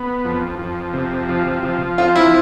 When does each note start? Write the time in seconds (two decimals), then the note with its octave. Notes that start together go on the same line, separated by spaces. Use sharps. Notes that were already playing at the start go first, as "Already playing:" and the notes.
Already playing: B3
0.25 F2
0.59 F2
0.93 C3
1.29 F3
1.63 F3
1.98 C4 F4
2.15 E4